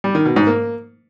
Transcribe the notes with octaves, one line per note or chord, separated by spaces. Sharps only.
G3
D#3
B2
G#2
A#3